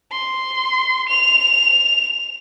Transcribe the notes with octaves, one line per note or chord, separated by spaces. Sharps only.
C6
F7